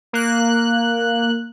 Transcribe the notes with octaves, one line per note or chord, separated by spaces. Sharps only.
A#3 F#6